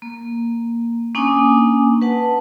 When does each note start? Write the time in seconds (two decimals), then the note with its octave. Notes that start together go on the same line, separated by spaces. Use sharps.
0.02 A#3
1.15 A#3 C#4 D4 G#5 D6 D#6
2.01 B4 F#5 A5